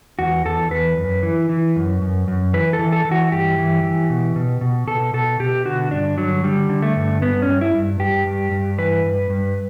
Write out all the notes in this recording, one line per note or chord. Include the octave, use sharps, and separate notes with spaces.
E2 F#4
E2 A4
E2 B4
F#2
E3
E3
F#2
F#2
F#2
E3 B4
A4
E3
A4
E3
F#4
G2 G4
E3
E3
B2
B2
B2
B2 A4
B2 A4
B2 G4
D3 F#4
G2 D4
D3 F#3
D3 G3
D3
A3
G2
G2 B3
C#4
G2
E4
G2
G2 G4
G2
G2
E3 B4
G2
G2